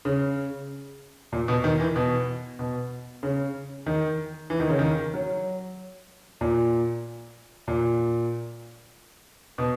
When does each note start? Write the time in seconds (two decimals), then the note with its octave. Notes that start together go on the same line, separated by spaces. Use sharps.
0.05 C#3
1.32 A#2
1.48 B2
1.64 D#3
1.80 E3
1.96 B2
2.59 B2
3.23 C#3
3.86 D#3
4.50 E3
4.60 D#3
4.69 C#3
4.79 D#3
5.14 F#3
6.41 A#2
7.68 A#2
9.58 B2